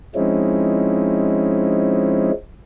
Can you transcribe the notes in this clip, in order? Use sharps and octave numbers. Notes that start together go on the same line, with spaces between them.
F3 G#3 C4 C#4 D#4 E4